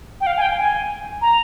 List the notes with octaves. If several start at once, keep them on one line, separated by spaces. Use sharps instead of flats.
G5
F5
G#5
G5
G#5
A#5